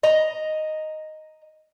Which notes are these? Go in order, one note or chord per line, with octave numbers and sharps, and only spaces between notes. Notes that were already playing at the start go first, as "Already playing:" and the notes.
D#5 A#5